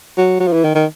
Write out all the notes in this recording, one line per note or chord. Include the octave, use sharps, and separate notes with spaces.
F#3
F#3
F3
E3
D#3
D#3